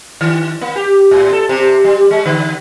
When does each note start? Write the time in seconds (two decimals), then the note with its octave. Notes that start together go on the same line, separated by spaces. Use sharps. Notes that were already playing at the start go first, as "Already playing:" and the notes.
0.21 D#3
0.61 A#3
0.76 G4
1.11 A2
1.32 A4
1.49 C3
1.84 G3
2.11 G#3
2.26 D3